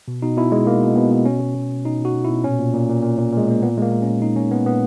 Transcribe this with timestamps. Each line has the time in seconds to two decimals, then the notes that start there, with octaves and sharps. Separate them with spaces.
0.08 B2
0.22 B2 D#4
0.37 B2 E4
0.52 B2 G#3
0.66 B2 A#3
0.82 B2
0.96 B2 B3
1.11 B2
1.25 B2 C#4
1.41 B2
1.55 B2
1.71 B2
1.85 B2 D#4
2.00 B2
2.05 F#4
2.14 B2
2.25 E4
2.30 B2
2.44 A#2 C#4
2.59 A#2
2.74 A#2
2.89 A#2
3.03 A#2
3.18 A#2
3.33 A#2 G#3
3.48 A#2 A#3
3.62 A#2 B3
3.77 A#2 G#3
3.82 A#3
3.92 A#2
4.02 C#4
4.07 A#2
4.21 A#2 D#4
4.36 A#2 C#4
4.51 A#2 B3
4.66 A#2 B3